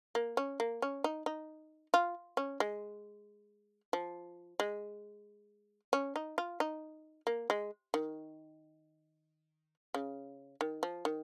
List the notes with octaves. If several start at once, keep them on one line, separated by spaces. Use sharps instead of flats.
A#3
C#4
A#3
C#4
D#4
D#4
F4
C#4
G#3
F3
G#3
C#4
D#4
F4
D#4
A#3
G#3
D#3
C#3
D#3
F3
D#3